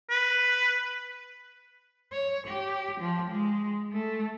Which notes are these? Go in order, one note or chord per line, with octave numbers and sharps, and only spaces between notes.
B4
C#5
G4
F3
G#3
A3